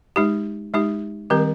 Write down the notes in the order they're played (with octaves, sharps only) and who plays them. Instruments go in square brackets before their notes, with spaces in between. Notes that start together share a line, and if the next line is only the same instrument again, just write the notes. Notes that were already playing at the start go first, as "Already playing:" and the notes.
[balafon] G#3 D#4 G4
G#3 D#4 G4
D#3 G3 C4 G4 A#4